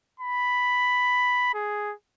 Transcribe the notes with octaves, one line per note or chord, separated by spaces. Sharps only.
B5
G#4